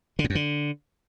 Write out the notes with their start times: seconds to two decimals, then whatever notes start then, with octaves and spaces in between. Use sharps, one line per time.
0.19 D3
0.24 A2
0.30 F#2
0.35 D3